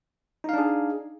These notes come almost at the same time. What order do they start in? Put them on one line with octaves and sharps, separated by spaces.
D#4 F5 D4 G#4